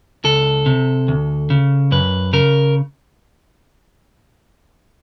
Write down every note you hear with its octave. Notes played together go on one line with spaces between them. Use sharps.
C#2 A4
C3
D2
C#3
F#2 B4
C#3 A#4